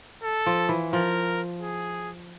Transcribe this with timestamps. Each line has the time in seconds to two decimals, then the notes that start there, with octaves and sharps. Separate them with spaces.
0.23 A4
0.46 F3
0.69 E3
0.93 F3 A#4
1.62 G#4